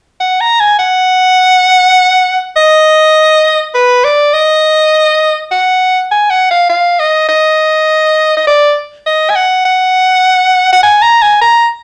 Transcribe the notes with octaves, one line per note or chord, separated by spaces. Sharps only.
F#5
A#5
G#5
F#5
D#5
B4
D5
D#5
F#5
G#5
F#5
F5
F5
D#5
D#5
D#5
D5
D#5
G#5
F#5
F#5
F#5
G#5
A#5
G#5
A#5